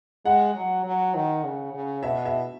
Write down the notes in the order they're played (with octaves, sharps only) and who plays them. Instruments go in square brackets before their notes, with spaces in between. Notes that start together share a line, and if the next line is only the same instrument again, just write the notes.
[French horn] G#3 [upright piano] F#5
[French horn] F#3
F#3
D#3
C#3
C#3
[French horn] B2 [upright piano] E5
[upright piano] E5